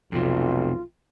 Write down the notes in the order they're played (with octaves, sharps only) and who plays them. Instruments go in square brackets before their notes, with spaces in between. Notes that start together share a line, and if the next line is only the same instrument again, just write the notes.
[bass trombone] B1 [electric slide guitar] F2 C3 [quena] F4